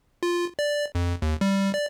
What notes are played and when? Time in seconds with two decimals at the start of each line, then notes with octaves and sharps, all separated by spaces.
0.23 F4
0.59 D5
0.95 F2
1.22 D#2
1.41 G3
1.74 D5